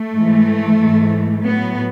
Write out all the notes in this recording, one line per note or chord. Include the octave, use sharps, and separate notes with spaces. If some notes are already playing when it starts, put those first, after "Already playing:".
Already playing: A3
G#2 E3
G#2 E3
A2 F#3 B3